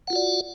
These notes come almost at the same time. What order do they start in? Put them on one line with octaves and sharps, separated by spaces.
F#5 F4 F#4 D5